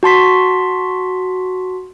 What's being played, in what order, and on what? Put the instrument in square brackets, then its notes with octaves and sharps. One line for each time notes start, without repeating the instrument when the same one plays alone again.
[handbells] F#4 A5 C6 B6